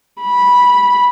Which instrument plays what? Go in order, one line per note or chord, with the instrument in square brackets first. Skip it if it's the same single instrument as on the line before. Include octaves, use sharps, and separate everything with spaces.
[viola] B5